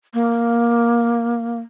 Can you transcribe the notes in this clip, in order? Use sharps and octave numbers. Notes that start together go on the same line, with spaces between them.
A#3